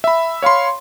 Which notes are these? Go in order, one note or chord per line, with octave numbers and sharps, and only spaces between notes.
E5 B5
C#5 F5 B5 C6